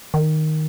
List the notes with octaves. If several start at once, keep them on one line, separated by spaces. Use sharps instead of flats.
D#3